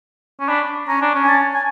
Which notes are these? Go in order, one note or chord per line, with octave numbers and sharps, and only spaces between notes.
C#4
D4 B5
C#4 A#5
D4
C#4
G#5
A5
G#5